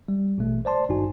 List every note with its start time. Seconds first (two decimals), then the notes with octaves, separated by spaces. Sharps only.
0.08 G3
0.38 A1 B2 A3
0.65 C5 D5 A5 C6
0.89 G#1 G2 D#4 F#4 G#5